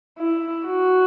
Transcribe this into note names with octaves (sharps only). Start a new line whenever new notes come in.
E4
F#4